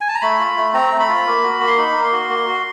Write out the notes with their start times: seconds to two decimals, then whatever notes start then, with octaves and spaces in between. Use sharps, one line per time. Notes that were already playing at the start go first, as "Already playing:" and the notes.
0.01 G#5
0.08 A5
0.15 A#5
0.21 A3 B5
0.39 F4
0.57 A3
0.74 C4 A#5
0.92 A3
1.00 B5
1.09 F4
1.27 A#3
1.43 F#4
1.60 A#3
1.67 C6
1.77 D#4 B5
1.96 A#3
2.04 C6
2.12 F#4
2.30 A#3
2.47 F#4